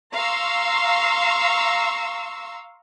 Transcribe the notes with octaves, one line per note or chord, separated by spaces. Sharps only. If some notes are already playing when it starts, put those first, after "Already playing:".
F5 A#5 C6 C#6 E6